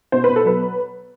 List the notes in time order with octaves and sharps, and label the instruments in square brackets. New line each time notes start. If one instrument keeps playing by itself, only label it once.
[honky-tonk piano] B2 C5
B2 B4
A4
F#3 B4